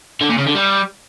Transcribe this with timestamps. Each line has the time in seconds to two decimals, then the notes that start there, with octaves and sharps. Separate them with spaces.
0.21 D3
0.30 A#2
0.38 C#3
0.47 D3
0.55 G3